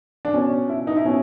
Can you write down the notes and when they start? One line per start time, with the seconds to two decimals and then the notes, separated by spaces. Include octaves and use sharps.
0.25 D4
0.33 B2 C#4
0.69 E4
0.87 D#4
0.96 E4
1.05 B2 C#4